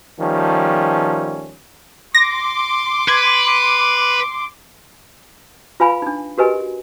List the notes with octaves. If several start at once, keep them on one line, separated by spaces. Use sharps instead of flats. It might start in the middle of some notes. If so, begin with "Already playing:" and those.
D#3 F3 G3 A3 C#4
C6 D6 A#6
B4 G#6
F4 B4 F5 G#5 B5
D4 D#4
F#4 G4 A#4 B4 D#5 G#5